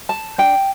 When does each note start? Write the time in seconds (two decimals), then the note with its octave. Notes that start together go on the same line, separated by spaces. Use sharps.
0.09 A5
0.38 D4 G5